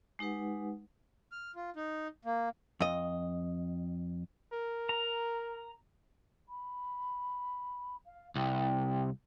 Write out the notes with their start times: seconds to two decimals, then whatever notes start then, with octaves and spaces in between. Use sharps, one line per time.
0.19 G#3 D#4 G4 B4 F#5
1.32 F6
1.55 F4
1.76 D#4
2.25 A#3
2.80 F2 D#5
4.53 A#4
4.89 A#5
6.49 B5
8.06 F5
8.35 C2 G5